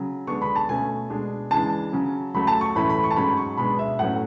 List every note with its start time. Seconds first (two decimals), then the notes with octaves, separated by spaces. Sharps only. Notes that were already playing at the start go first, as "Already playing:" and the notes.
Already playing: C#3 F#3
0.27 D3 G#3 B3 D4 C#6
0.42 B5
0.56 A5
0.69 B2 A3 C#4 G#5
1.10 B2 G#3 D4
1.51 C#3 E3 G#3 D4 A5
1.93 C#3 F#3 C#4
2.34 C#3 F#3 A3 B5
2.47 A5
2.61 C#6
2.75 A2 E3 A3 C#4 B5
2.90 B5
3.04 C#6
3.11 A5
3.16 G#2 F#3 C#4 B5
3.37 C#6
3.58 B2 G#3 B3 D4 B5
3.79 E5
3.99 A2 F#3 A3 C#4 F#5